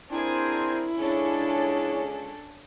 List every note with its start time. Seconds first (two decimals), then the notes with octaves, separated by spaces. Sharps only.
0.11 C4 D4 E4 G#4 A#4 C5 G#6
0.99 C#2 C#4 D4 G#4 A4 C#5